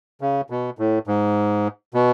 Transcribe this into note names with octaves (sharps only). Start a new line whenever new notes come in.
C#3
B2
A2
G#2
B2